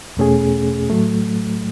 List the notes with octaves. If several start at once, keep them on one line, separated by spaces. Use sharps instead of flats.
E2 B2 A3 C#4 G#4
A2 F#3 A3